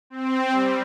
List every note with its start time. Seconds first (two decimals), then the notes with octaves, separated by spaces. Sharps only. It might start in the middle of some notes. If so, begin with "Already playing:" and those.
0.10 C4
0.52 G3